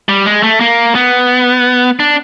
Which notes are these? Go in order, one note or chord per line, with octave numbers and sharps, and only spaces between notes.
G3
G#3
A3
A#3
B3
D4